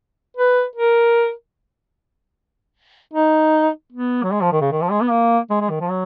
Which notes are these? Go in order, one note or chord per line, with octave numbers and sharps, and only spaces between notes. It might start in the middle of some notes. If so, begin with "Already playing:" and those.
B4
A#4
D#4
B3
F#3
G#3
F3
D#3
C#3
D#3
F3
G#3
B3
A#3
G#3
G#3
D#3
F3
F#3